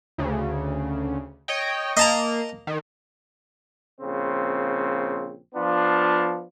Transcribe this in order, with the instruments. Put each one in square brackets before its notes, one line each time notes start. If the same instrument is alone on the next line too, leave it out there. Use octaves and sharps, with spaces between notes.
[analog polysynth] D2 C#3
C#5 D#5 G5
[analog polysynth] A#3 [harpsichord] D#5 A5 A#5
[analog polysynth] D#3
[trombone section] A#1 C#3 C4
F3 B3 D4 F4